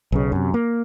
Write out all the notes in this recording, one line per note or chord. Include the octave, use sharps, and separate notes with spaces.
B1 C#3
F#2 C3
A#3